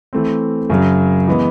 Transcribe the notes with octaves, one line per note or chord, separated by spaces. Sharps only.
E3 A3 C4
F#2 C#3 F#3
E3 G#3 B3